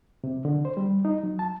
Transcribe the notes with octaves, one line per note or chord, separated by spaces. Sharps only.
C3
D3
C5
G3
D#4
F#3
A5